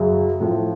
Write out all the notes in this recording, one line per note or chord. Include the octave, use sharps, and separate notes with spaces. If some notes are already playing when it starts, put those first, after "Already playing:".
Already playing: F#2 C#3 F#3
A2 F3